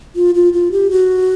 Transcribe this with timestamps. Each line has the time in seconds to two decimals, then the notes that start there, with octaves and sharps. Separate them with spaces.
0.16 F4
0.35 F4
0.53 F4
0.72 G4
0.90 F#4